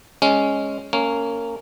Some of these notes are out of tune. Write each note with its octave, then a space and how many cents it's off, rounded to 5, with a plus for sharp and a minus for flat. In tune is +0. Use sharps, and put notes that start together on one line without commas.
G#3 +0 C#4 +0
A#3 -20 C#4 +5 C#5 +0